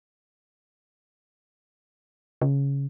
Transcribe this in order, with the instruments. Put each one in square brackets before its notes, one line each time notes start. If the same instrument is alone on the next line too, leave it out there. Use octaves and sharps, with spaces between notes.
[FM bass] C#3